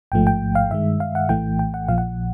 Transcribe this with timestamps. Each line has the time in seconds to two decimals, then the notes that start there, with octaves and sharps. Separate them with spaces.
0.12 A1 G#2 F3 A3 G5
0.27 G5
0.55 F5
0.70 G2 D#3 G#3 E5
1.00 F5
1.15 F#5
1.29 A#1 A2 E3 A3 G5
1.59 G5
1.74 F#5
1.88 A#1 A#2 F3 F5
1.98 F#5